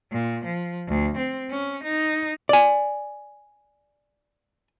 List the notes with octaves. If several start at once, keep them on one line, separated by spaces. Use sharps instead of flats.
A#2
F3
D2
C4
C#4
D#4
D5 G#5